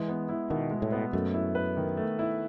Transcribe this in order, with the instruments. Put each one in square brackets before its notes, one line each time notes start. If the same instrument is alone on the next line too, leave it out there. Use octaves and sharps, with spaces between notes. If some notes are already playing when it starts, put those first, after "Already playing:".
Already playing: [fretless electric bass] E3 [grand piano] G#3
[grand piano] B3
E4
[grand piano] B2 [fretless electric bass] D#3
[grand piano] G#3
[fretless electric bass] A2
[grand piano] B3
[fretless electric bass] F#2 [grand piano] A3
[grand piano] E4
B4
D#3
A3
E4